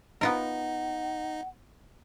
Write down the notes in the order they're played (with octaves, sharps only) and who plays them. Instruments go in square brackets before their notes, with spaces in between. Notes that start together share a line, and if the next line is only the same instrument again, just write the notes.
[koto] B3 F4 A#4 [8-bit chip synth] D#4 [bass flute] F#5